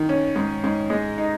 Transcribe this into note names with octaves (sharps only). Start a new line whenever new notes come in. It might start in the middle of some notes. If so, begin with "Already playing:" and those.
Already playing: D#3
C#4
G#2
G#2
G#3
D#4